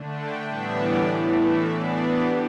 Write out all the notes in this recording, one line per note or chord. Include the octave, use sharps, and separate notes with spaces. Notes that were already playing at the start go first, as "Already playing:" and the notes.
Already playing: D3 A3 D4
G5
A2 E3 G3 B3 D4 E5
D5
A2 E3 A3
E5
E3 B3 D4 D5
G4